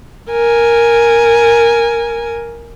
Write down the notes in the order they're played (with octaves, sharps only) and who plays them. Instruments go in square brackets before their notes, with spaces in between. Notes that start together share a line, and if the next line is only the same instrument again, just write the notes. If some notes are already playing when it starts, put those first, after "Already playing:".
[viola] A#4 G#5